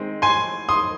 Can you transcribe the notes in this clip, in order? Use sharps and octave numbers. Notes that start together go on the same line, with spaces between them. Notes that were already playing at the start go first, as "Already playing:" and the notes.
Already playing: D#3 G#3 C4
G#5 C6
C6 D#6